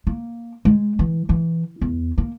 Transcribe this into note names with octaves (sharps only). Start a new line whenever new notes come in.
A#3
G#3
E3
E3
E2
A#3